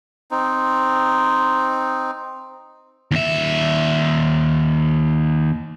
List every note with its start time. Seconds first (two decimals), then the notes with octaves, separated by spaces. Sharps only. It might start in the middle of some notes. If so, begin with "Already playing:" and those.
0.31 C4 D#4
3.11 D#2 E5